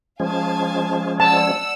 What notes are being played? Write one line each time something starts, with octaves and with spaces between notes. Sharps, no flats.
F3 G#3 C#4 F5 G#5 A5
D5 F#5 A5 E6